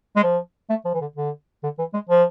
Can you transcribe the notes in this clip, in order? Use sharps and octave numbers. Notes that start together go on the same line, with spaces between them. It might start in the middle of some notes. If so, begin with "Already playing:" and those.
G#3
F3
A3
F3
E3
D3
D3
D3
E3
G#3
F3